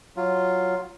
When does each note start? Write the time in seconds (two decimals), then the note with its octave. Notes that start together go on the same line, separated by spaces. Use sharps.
0.17 F#3 F4